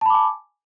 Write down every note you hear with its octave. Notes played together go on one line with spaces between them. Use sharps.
G#5 A5 B5 D6